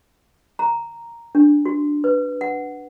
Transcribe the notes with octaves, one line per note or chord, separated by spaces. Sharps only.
A#5
D4
F#4
B4
F#5